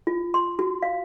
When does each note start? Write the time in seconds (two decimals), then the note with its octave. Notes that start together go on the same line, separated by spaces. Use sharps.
0.07 F4
0.34 C6
0.59 F#4
0.82 F5